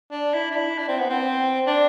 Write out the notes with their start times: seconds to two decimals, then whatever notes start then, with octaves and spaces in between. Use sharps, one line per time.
0.11 D4
0.34 E4
0.51 D4
0.56 E4
0.78 D4
0.88 C4
0.99 B3
1.10 C4
1.66 D4